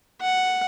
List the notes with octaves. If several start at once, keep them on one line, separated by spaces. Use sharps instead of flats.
F#5